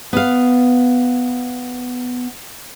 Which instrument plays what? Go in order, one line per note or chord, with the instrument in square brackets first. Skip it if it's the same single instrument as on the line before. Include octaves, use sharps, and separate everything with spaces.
[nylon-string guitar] B3 F5